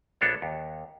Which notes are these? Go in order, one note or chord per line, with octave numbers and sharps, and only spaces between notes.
A#1 B3 D4 A4 C#5
D#2